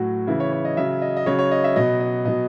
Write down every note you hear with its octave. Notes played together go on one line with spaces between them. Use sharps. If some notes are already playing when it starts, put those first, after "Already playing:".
Already playing: A2 F#3 F#4
C#3 E3 E4
C#5
C#5
D#5
C#3 F#3 E5
D#5
D#5
C#3 F#3 C#5
C#5
D#5
E5
B2 F#3 D#5
D#5
B2 F#3 D#5